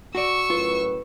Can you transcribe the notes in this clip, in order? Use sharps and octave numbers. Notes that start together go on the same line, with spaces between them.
F#4 D5 C#6 E6
F#2 A2 F4 B4